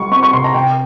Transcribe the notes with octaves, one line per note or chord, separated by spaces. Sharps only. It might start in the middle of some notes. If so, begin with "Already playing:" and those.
Already playing: G3 C#6
C4 C#6
C#6
C3 C6
A#5
C3 G5